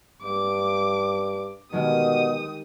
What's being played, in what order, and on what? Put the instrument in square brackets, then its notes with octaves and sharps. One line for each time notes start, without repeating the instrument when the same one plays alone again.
[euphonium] G2 [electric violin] D6
[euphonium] B2 [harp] D#3 G#3 F6 [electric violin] G4 D#6